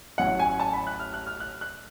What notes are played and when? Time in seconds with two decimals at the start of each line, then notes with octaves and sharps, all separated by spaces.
0.18 A1 A2 F#3 C#4 F#5
0.39 G#5
0.60 A5
0.73 B5
0.87 F#6
1.00 F6
1.14 F#6
1.27 F6
1.40 F#6
1.61 F#6